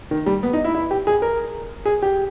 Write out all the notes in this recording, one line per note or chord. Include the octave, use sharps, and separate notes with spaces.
D#3
G3
B3
D#4
E4
E4
G4
G#4
A#4
G#4
G4